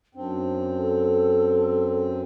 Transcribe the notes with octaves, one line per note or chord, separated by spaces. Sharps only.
F#2 C4 D4
A4